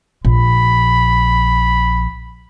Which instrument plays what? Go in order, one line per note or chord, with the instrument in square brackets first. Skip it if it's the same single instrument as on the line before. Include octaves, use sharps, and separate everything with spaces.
[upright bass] A#1 [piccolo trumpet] B5